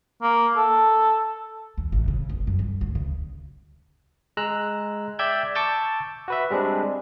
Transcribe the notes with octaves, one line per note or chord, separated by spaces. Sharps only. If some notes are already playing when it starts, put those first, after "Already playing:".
A#3
A4
D#2
A1
C#3
F1
F#2
G2
D2
C#3
G#3 A#5 E6 F#6
D5 E5 G5 E6 G6 G#6
A5 C#6 D6 E6 G6 A6
F#4 B4 E5
G3 G#3 C4 D4